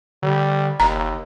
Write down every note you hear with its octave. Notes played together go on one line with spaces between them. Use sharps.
D3 G3
F#1 D#2 A#5